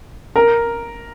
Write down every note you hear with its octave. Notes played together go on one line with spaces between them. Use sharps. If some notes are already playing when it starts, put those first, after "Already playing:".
A#4